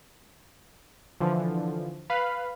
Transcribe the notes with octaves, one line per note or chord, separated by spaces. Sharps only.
D3 E3 F3
B4 F5 B5